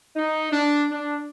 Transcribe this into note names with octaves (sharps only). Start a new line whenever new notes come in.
D#4
D4
D4